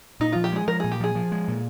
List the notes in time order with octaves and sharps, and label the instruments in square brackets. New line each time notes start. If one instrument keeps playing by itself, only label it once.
[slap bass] A#2 [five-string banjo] D#4
[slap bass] F3 [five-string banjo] F4
[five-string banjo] G4
[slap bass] G#3 [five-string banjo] G#4
[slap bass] F3 [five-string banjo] A#4
[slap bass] A#2 [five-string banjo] G#4
[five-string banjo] G4
[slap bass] F3 [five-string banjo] G#4
[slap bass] F3
G#3
A#2